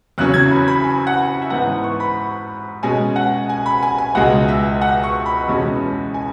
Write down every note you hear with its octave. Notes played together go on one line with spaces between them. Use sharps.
E2 C#3 F#3 C#4 F#6
G#6
B5
B5
G#5
F#5
E5
G#2 E3 B3 F#5
C#6
B5
B2 G#3 C#4 G#5
F#5
G#5
B5
G#5
G#5
C#2 B2 G#3 F#5
E5
F#5
C#6
B5
E2 B2 G#3 C#4
G#5